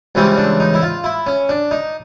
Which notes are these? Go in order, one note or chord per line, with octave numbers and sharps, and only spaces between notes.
C#2 C#3 E3 G3 C4 C#4
D4
D#4
E4
F4
E4
C#4
D4
D#4